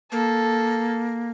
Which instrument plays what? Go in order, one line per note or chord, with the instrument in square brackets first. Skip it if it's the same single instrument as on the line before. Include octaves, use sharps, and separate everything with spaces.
[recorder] A#3 [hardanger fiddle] A4